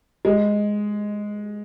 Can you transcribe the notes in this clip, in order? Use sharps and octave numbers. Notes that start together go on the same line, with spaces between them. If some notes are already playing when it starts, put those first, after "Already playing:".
G#3